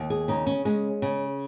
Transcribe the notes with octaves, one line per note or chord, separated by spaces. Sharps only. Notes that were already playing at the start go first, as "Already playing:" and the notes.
Already playing: D#2
G#4
C#3 D#4
C#4
G#3 C#4
C#3